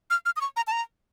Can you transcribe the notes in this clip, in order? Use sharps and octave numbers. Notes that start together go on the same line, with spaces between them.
F6
F6
D#6
C#6
A#5
A5
A#5